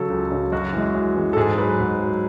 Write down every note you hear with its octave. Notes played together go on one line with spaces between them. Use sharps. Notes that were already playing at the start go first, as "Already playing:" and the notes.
Already playing: C#3 F#3 A4
C#2
C#3 F#3
F#2 F#4
E3 G#3
F#2
E3 G#3
A4
G#2 G#4
F#3 B4
G#2
F#3